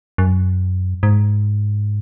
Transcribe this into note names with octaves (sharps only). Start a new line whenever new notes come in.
F#2
G#2